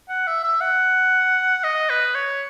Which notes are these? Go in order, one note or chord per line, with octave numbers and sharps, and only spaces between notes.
F#5
E5
E5
F#5
D#5
B4
C#5